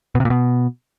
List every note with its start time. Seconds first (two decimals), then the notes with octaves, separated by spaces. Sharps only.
0.15 B2
0.20 C3
0.25 A#2
0.30 B2